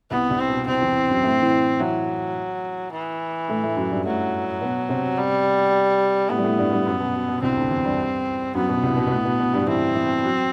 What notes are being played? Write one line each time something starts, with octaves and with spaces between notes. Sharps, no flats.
C2 C3 B3
C2 C3
C4
B2
C2 C3 C4
E2 E3
F#2 F#3
A2 A3
E3 E4
E3 F#3 E4
E3
A2 A3
A2 A3
F#2 F#3
G2 G3
A2 F#3 A3
B2 B3
C3 C4
G3
A2 A3 B3
G3
A2 A3
G2 G3
G2 G3
F#2 F#3
B2
B2
B2
C2 C3 C4
D2 D3
E2 E3
G2 G3
F#2 F#3 B3
B2
C2 C3
B2
B2
A2
B2
B2
G2 G3
E3 C4 E4
E3 E4
F#3 F#4